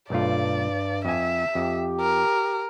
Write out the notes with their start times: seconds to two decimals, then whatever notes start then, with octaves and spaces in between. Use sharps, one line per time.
0.10 B1 G2 A3 F4 D5
1.05 F2 E5 G#5
1.55 F2 G4
2.01 A#4